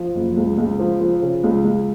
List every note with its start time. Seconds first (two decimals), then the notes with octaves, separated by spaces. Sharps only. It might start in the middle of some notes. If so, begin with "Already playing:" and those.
Already playing: F3
0.15 F#1
0.37 C#2
0.58 C#2
0.79 F3
1.01 F3
1.22 C#3
1.44 C#2
1.65 C#2